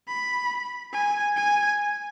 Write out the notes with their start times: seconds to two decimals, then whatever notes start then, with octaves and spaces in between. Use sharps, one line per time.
0.08 B5
0.93 G#5
1.36 G#5